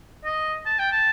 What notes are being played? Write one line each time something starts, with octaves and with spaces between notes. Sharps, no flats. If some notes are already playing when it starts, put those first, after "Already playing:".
D#5
A5
G5
A5